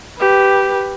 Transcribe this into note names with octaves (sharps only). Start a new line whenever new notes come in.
G4 B4